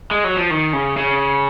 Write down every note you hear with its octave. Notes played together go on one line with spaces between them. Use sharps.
G#3
F#3
F3
D#3
C#3
C#3